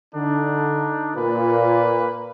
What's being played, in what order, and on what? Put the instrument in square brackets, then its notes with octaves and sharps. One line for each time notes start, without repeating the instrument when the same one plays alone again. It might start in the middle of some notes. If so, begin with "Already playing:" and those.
[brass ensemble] D3 [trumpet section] D4 D#4
[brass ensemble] A#2 [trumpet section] A#3 B4